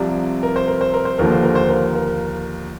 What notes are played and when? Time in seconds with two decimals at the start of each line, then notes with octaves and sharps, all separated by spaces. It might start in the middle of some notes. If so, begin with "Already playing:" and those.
Already playing: C2 C3 F3 D5
0.43 A#4
0.56 C5
0.68 A#4
0.81 C5
0.94 A#4
1.05 C5
1.18 D#2 D3 F3 A#4
1.31 C5
1.43 A#4
1.55 C5
1.68 A#4
1.95 A#4